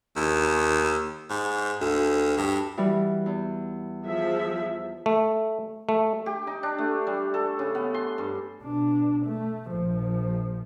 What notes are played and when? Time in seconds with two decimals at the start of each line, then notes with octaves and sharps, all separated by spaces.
0.16 D#2
1.30 G#2
1.81 D2
2.37 G2
2.77 E3 G3 F#4
3.26 E2
4.05 F3 G#4 E5
5.06 A3
5.89 A3
6.26 G4
6.47 D#4
6.63 D4
6.78 A3
7.07 G3
7.34 A4
7.59 C#3
7.75 B3
7.94 C6
8.18 G2
8.63 B2 D4
9.26 A3
9.71 A#1 F3